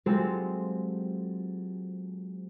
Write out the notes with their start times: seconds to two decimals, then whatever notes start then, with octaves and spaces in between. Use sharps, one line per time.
0.06 F#3 G#3 C4 F4 G4 A4